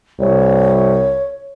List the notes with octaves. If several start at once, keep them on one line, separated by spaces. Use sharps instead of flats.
C2 C#5